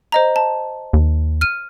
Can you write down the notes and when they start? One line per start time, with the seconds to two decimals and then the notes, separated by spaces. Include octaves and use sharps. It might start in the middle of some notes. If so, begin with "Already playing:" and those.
0.12 C5 D#5 A#5
0.36 A5
0.93 D#2
1.41 F6 D#7